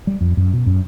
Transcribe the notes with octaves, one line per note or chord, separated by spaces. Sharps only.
G3
F2
F#2
B2
F#2